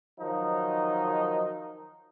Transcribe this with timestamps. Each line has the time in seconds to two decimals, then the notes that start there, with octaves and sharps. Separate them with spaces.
0.20 D#3 F3 F#3 D#4